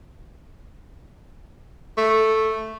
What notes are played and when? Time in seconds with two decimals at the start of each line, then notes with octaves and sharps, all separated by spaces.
1.98 A3